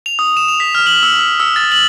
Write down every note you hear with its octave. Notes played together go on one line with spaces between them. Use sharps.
F7
D#6
E7
F7
B6
F6
F#7
E6
E6
E6
A6
F#7